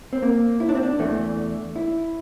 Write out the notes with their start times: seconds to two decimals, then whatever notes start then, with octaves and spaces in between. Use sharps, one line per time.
0.13 C4
0.22 A#3
0.60 E4
0.69 D4
0.75 C4
0.83 D4
0.99 E2 E3 A3
1.76 E4